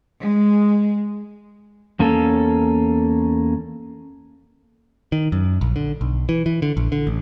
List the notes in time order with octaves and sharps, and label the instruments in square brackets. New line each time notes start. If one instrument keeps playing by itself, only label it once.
[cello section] G#3
[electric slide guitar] E2 A#3 C#4 A4
[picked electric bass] D#3
F#2
A#1
D3
B1
E3
E3
D3
A#1
D3
A1